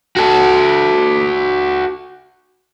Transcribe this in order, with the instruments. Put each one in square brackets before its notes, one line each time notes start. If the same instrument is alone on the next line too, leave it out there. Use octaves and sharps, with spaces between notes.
[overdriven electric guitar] F#4 A4